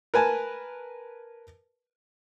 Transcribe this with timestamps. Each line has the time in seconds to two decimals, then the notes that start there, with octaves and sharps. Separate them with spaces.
0.14 A#4 B4 G#5 A5